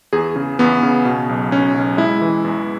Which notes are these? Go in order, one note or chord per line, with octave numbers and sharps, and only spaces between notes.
E2 G#4
C#3
E2 B3
C#3
B2
B1
B1 C#4
B1
G#3 E4
E3
E2